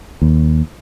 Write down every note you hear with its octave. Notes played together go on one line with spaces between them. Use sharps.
D#2